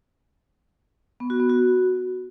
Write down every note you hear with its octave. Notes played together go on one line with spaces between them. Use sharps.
B3
F#4
B3
F#4